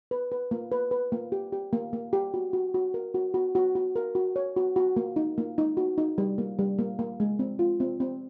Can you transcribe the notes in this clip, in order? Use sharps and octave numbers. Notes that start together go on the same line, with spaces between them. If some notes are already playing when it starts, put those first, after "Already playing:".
B4
B4
A#3
B4
B4
A#3
G4
G4
A#3
A#3
G4
F#4
F#4
F#4
A#4
F#4
F#4
F#4
F#4
A#4
F#4
C#5
F#4
F#4
A#3
D#4
A#3
D#4
F#4
D#4
G3
A#3
G3
A#3
A#3
G#3
C4
F4
C4
C4